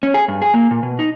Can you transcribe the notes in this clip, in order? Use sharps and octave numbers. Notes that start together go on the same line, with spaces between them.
C#4
G#4
G2
G#4
A#3
A#2
B2
D#4